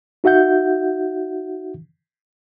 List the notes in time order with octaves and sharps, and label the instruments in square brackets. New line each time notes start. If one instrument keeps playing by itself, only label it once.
[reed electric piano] D#4 F#4 E5 F#5 G6